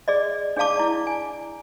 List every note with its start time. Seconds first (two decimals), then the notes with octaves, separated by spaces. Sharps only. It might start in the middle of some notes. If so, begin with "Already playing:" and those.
0.08 G#4 D5 D#5
0.57 D4 G#4 D5 F5 A5 D6
0.76 E4 D5
1.07 G#5